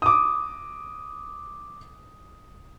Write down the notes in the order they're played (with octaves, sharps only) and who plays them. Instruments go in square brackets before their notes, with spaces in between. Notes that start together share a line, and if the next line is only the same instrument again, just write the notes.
[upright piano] D6 D#6